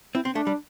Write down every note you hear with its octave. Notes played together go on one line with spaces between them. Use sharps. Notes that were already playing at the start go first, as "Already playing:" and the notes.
C4 E4
C4
A3 D4
G3